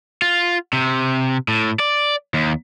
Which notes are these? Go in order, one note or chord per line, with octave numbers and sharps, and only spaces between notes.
F4
C3
A2
D5
D#2